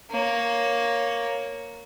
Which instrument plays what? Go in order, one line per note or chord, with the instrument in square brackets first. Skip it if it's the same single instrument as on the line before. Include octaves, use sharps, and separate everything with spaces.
[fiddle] A#3 C#5